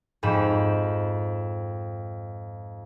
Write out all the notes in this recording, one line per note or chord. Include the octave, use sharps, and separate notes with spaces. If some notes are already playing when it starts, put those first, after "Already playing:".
F2 G#2 B5 E7